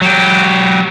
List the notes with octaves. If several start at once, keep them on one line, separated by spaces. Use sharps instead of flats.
F#3 G4